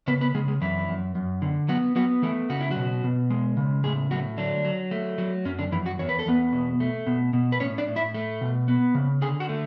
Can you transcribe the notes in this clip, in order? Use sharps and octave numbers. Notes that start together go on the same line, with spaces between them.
C#3 B3 B4
B3 B4
C#3 G#3 G#4
G#3 G#4
F#2 E3 E4
F#2
F#2
D3
F#3 B3 F#4
F#3 B3 F#4
E3 A3 E4
C#3 F#4
E4
F#3 F#4
B2
B2
G#3
C#3
A2 G#3 G#4
A2 F#3 F#4
D3 F#3 D4
F#3
A3
F#3
F#2 C#4
D3 D4
F#2 E3 E4
F#3 F#4
E2 C#5
B4
A4
E2 B3 B4
B2
A3
B2
B2
B4
A2 C#4 C#5
D4 D5
A2
E4 E5
A3
B2
B3
C#3
D3 G#4 G#5
F#4 F#5
A3